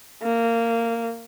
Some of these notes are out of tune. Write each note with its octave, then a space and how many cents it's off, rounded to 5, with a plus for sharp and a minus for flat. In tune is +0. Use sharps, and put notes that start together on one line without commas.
A#3 -15